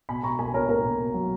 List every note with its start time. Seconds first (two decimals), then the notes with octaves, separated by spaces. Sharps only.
0.09 B2 G#5 B5
0.23 B2 A#5 C#6
0.39 A#3 G#5 B5
0.54 B2 A#4 C#5
0.69 A#3 A#4
0.84 B2
0.99 B2
1.14 F#3